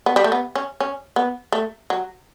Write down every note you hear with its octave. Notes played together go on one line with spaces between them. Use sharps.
B3
G3
A3
B3
C#4
C#4
B3
A3
F#3